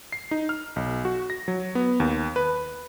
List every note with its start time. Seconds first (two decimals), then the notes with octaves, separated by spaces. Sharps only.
0.13 C7
0.31 D#4
0.49 F6
0.76 B1
1.05 F#4
1.30 A#6
1.48 F#3
1.75 B3
2.00 D#2
2.36 B4